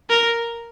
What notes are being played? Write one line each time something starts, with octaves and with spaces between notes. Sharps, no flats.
A#4